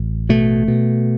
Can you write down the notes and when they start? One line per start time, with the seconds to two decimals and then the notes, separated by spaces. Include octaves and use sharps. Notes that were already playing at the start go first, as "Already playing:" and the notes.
Already playing: A1
0.29 B2 A3
0.68 B2